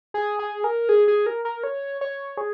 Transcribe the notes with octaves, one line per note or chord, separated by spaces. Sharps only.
G#4
G#4
A#4
G#4
G#4
A#4
A#4
C#5
C#5
G#4